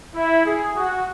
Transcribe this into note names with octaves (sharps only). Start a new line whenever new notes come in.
E4
G#4
F#4